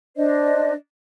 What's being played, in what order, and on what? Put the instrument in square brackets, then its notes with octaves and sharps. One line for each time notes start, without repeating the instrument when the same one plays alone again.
[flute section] D4 C5 D5 D#5